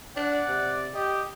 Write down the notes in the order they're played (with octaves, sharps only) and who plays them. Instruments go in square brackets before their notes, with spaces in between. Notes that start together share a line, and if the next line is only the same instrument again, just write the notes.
[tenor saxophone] D4 [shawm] D5 [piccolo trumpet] F#5
[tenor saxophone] C3
[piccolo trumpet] G4 [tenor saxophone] D#5